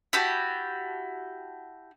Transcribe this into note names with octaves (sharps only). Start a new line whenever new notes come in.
E4 F#4 G4 A5